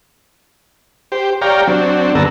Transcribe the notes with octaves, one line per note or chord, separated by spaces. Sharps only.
G4 C5
G4 C#5 D5 F5 G5 A#5
F#3 C4 D4
G2 D3 B3 A4 A#5 E6